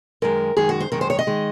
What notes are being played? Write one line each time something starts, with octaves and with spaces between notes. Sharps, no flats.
F#2 D#3 G#3 A#4
F#2 D#3 G#3 G#4
F#4
C5
F#2 D#3 G#3 A#4
C5
C#5
D#5
D#3 G#3